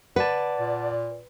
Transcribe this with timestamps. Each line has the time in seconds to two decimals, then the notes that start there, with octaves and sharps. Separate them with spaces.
0.16 B4 D5 F#5 A5
0.59 A#2